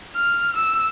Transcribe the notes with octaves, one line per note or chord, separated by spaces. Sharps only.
F6
E6